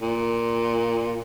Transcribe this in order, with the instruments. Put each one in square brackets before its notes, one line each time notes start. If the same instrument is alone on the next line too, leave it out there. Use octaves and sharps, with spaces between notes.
[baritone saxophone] A#2